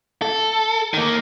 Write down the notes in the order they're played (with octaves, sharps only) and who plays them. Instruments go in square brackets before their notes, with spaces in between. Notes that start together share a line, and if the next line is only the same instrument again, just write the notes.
[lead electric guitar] A4
D#3 A#3